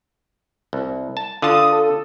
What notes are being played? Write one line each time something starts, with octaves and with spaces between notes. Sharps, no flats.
C2
A5
D3 F4 A5 D#6
A4